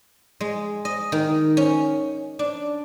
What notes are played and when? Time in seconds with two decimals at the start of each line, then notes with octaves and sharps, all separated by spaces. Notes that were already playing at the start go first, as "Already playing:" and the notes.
0.40 G#3
0.85 D#5
1.12 D#3
1.57 C#4
2.39 D4